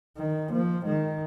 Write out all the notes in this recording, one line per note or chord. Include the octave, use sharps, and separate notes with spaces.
D#3
F3 A#3
D#3 G#3